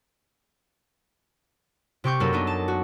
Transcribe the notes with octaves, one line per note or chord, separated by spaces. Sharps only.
C3 G4 C#6 G6
F#2 A#3 D#4 A4
B3 D4 D#4
A5
F#4